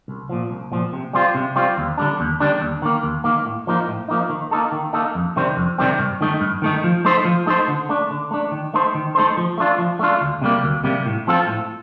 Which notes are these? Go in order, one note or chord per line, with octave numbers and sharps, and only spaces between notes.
C2
A#2 F3
C2
A#2 F3
C3
G3 C4 F4
C3
G3 C4 F4
D#2
D3 G3 D4
D#2
D3 G3 D4
D#2
D#3 A#3
D#2
D#3 A#3
A2
F3 A#3 D#4
A2
F3 A#3 D#4
D#3
A#3 D#4 A4
D#3
A#3 D#4 A4
F2
C3 D#3 G3 C4
F2
C3 D#3 G3 C4
G2
D#3 A3 D#4
G2
D#3 A3 D#4
F3
A3 D#4 A4 C5
F3
A3 D#4 A4 C5
D3
A3 D4
D3
A3 D4
D#3
A3 D#4 A4 C5
D#3
A3 D#4 A4 C5
F3
A3 D4 F4
F3
A3 D4 F4
D2
C3 G3 A#3
D2
C3 G3 A#3
A2
F3 C4 F4 A4
A2